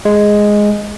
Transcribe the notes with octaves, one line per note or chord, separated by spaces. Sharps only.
G#3